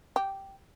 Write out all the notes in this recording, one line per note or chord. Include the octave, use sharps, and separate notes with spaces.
G4